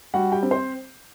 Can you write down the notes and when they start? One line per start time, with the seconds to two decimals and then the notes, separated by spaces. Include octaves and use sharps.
0.14 G3 F#4 F#5
0.32 G4 G5
0.43 C4
0.51 C5 C6